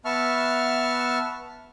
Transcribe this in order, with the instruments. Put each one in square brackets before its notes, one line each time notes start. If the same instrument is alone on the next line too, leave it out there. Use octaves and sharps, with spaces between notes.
[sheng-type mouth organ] B3 E5 A5 C#6 F6